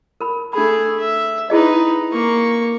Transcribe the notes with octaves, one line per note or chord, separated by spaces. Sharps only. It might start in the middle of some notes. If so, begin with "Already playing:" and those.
A#4 B5
A3 D4 G#4 B5
E5
D#4 E4 G#4 B4 D#5
A#3 C#6